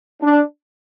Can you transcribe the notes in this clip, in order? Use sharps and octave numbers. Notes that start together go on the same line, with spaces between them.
D4